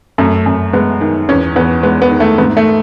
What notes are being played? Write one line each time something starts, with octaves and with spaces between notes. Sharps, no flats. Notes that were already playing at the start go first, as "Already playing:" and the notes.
F#2 A3
F#2
G#3 B3
D#3
E2 C#4
E2 B3
G#3 B3
B3
D#3
A3
G#2 B3
A3